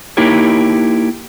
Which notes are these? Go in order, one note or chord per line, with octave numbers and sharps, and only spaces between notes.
A#3 D#4 E4 G4 A#4 C#5